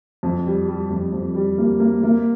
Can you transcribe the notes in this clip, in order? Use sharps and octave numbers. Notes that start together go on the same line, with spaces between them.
F2
G3
G3
F2
F2
G3
A#3
A#3
A#3